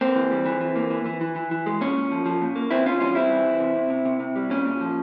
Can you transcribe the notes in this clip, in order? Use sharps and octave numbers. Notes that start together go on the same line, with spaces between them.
A#3 C4
E3
G3
E3
E3
A#3
E3
E3
E3
E3
E3
G#3
A#2 C#4
A#2
F3
F3
A#2
A#3
E3 C4 E4
E3 C#4 F4
G3 C#4 F4
G3 C4 E4
E3
E3
C3
C3
C3
C3
C3
G3
A#2 C#4
A#2
F3